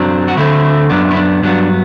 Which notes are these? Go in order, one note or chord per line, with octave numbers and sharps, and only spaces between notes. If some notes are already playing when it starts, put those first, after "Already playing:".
Already playing: F#2 F#3 C4 D4
F#4
D2 D3 A3 C4 E4
F#2 E3 B3 D4
E4
D4
G2 F#3 B3 D4